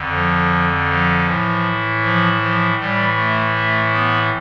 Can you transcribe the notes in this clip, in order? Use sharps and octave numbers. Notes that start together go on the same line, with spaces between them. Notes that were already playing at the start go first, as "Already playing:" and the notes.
Already playing: F2 D3
F3
F3
A2 E3
F3
F3
A2 E3 G3
A3
A3
B3